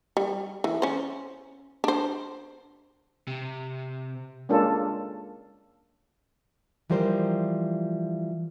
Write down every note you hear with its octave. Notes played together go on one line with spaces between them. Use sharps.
G3
E3
C#4 C5
D4 C5
C3
G#3 A#3 C#4 D4 F4 A4
E3 F3 G3 A#4 C5